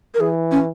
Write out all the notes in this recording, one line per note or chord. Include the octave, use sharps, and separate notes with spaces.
A#4
E3 G#4
C#4